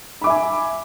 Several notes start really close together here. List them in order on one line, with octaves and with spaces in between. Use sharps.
B5 D6 E5 G#5